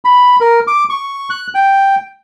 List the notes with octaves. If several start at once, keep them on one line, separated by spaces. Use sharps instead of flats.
B5
A#4
D6
C#6
F#6
G5